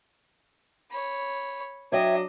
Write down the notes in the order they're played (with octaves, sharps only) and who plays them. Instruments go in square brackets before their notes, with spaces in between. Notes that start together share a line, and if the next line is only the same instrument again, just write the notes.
[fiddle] C#5 B5
[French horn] F#3 [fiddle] D4 D#5 [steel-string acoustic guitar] C#5 E5 G5